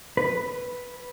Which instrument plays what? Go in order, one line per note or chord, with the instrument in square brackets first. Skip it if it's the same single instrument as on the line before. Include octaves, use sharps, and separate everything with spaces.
[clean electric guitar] B4